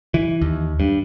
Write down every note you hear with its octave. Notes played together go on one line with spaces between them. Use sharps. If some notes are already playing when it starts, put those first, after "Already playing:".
E3
D#2
G2